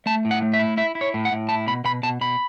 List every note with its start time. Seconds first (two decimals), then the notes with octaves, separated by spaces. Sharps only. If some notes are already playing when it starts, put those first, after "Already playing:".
0.06 A3 A5
0.25 A2
0.31 F#5
0.42 A3
0.53 E5
0.59 E4
0.77 E4 E5
0.95 E4
1.01 C#5
1.14 A2
1.25 F#5
1.32 A2
1.49 E4 A5
1.67 B2 B5
1.84 B2 B5
2.03 B2 A5
2.21 B2 B5